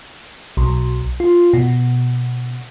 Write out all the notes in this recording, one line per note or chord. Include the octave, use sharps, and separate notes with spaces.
B1
F4
B2